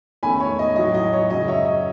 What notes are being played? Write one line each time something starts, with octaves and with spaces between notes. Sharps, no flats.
E2 D#3 A3 C#4 G#5 B5
C#5
D#5
A2 F#3 C#4 D#5
D#5
C#5
F#2 C#3 F#3 C#4 D#5
C#5 E5
D#5